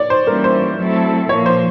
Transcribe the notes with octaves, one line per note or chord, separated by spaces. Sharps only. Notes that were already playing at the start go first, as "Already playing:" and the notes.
Already playing: A#2 C#5 D5
C5
E3 G3 A#3 C#4 E4 A#4
C5
F#3 A3 C4 E4 A4
A#2 F3 A#3 C#5
C5